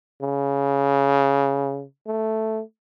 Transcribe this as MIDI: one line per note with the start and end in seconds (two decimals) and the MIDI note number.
0.22 1.85 49
2.07 2.62 57